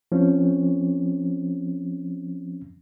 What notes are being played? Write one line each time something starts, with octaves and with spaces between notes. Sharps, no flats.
F3 C4 C#4